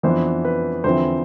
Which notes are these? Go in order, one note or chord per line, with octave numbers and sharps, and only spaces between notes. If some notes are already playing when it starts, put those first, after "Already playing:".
F2 E3 B3 D4 C5
B4
E2 D3 F3 C4 E4 C5